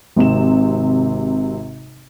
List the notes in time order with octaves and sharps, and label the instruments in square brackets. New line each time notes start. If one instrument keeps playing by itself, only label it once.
[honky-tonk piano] G#1 C3 E7